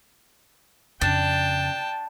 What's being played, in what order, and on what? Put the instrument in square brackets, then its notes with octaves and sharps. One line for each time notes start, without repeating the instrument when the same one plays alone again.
[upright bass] F2 C#3 [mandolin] D4 [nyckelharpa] G5 [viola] A5